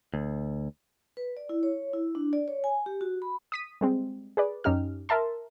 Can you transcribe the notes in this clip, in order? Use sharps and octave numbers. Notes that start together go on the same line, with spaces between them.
D2
B4
D5
E4
C#5
E4
D4
D5
C#5
G#5
G4
F#4
B5
D#6 B6 D#7
G3 G#3 C4
G#4 B4 D5
F#2 C#4 D#4 G4 F6
A#4 E5 A5 C6